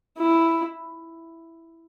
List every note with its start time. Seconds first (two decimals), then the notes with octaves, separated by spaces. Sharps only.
0.17 E4